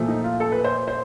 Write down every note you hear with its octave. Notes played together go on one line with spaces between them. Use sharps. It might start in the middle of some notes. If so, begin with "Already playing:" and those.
Already playing: A#2 F3 A3
D#4
F4
A4
B4
C5
C5